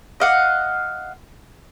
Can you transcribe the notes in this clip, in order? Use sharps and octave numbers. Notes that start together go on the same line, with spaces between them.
D#5 F5 F#5